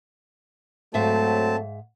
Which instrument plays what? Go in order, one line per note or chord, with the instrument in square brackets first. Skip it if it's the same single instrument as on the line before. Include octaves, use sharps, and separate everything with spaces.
[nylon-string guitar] G#2 E5 F5 [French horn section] F#3 A3 [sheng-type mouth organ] C4 A5